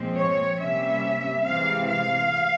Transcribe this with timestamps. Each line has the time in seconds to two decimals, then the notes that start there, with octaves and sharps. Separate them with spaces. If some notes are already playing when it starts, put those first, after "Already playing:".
Already playing: A#2 F3 G#3 C4
0.16 C#5
0.59 C3 G3 A#3 C#4 E5
1.44 C3 E3 G#3 C4 F5
1.87 F5